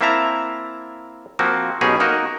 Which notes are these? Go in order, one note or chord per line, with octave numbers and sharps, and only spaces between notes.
A#3 C4 E4 E5 A5 A#5
F3 A#3 C4 F#4
B1 B2 C#4 D#4 G4 G#4
A#3 D#4 F#4 A#4 D#5